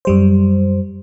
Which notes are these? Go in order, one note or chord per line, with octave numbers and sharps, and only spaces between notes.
F#2 G3 C5